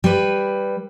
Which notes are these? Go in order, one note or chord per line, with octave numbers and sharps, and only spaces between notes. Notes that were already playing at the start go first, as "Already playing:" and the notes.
G3 B4